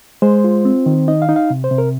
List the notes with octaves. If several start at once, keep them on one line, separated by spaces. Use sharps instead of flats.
G#3 C5
F4
C4
D#3
D#4 D#5
F5
D#4
F5
C3
C5
C3
A#4